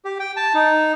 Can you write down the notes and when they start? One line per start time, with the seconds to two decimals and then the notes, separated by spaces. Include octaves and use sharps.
0.05 G4
0.20 G5
0.36 A5
0.54 D#4